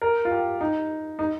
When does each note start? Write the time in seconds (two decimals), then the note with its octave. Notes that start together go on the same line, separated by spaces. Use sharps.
0.02 A#4
0.25 F4
0.31 G4
0.61 D#4
1.19 D#4